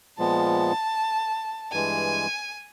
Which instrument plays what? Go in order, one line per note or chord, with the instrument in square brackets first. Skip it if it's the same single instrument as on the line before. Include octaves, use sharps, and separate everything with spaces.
[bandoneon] A#2 F3 G#3 B3 [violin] A5
[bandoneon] G2 E3 G#3 [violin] G#5